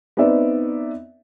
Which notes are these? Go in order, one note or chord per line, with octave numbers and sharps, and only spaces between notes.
B3 C4 D#4 D5 E5